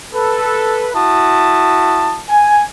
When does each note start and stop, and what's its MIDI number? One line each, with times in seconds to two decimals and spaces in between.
0.14 0.90 69
0.14 0.90 71
0.95 2.21 64
0.95 2.21 66
0.95 2.21 81
0.95 2.21 87
2.29 2.66 80